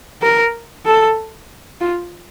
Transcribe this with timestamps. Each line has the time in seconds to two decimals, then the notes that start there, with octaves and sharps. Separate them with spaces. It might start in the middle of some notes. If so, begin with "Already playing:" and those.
0.22 A#4
0.85 A4
1.80 F4